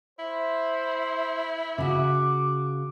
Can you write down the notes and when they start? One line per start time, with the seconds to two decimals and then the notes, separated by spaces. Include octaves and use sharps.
0.19 E4 C5
1.78 C#3 F#4 D6